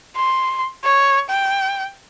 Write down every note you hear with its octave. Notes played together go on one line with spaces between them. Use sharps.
C6
C#5
G5